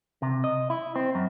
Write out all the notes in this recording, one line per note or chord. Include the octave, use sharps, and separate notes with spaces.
C3
D#5
E4
C4
F#2